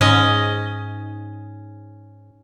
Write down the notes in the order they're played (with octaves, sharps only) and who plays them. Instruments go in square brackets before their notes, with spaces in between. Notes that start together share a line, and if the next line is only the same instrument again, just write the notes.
[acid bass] G#2 [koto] C#4 D#5